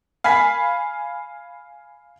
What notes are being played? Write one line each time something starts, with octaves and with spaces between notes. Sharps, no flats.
F5 G#5 B5 B6